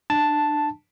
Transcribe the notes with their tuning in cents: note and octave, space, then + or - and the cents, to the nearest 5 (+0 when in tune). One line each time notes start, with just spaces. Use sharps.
D4 +30 A5 +0